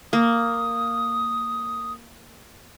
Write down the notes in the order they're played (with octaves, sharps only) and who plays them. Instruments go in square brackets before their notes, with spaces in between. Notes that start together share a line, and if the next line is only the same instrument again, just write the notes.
[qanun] A#3 [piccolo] D#6